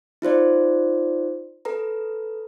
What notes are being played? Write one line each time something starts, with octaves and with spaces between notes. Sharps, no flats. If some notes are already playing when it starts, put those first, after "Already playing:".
D#4 F4 C5 D5
A4 B4 A#5